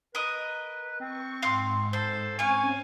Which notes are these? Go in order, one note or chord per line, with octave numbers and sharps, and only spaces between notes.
A#4 B4 D#5
C4 C#6
G#2 F5 C6 F#6
A4 C5
C4 C#4 F5 G#5 C#6